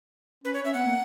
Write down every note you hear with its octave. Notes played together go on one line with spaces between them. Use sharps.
C#4 B4
C#5
C#4 E5
B3 F#5
A#3